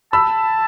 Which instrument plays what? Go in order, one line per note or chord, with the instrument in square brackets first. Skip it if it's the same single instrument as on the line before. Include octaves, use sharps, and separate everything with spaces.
[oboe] A5 [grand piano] B5 E6